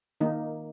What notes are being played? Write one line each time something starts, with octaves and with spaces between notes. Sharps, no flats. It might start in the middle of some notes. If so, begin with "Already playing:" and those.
D#3 A#3 D#4